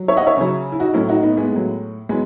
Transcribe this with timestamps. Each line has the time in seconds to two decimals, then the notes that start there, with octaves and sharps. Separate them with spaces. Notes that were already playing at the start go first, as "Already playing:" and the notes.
Already playing: F#3
0.08 C#5 E5
0.17 D#5 F#5
0.26 C#5 E5
0.37 C#3 F#3
0.72 E4
0.80 D#4 F#4
0.94 A2 F#3 C#4 E4
1.09 D#4 F#4
1.23 B3 D#4
1.37 G#3 B3
1.52 A2 F#3
2.09 F#3 G#3 B3